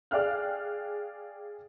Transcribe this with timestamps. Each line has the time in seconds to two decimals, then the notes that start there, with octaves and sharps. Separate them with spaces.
0.11 G#4 D5 F5 G5 F6 F#6